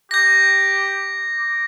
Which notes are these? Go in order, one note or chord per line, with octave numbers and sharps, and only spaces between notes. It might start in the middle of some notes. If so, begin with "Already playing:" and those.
G4 G6 A#6
D6